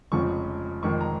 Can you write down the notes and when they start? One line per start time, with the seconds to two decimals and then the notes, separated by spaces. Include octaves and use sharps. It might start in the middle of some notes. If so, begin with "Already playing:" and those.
0.12 F1 F2 C#3 F3 G#3 C#6
0.83 F1 F2 D#3 G#3 C#6
1.01 A#5